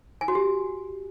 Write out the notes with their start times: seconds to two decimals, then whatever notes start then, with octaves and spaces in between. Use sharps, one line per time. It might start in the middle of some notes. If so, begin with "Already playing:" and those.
0.21 G#5
0.28 F#4
0.35 G4